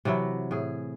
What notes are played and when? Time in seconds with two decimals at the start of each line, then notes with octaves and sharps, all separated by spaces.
0.05 C3 E3 F#3 E4
0.51 A2 G#4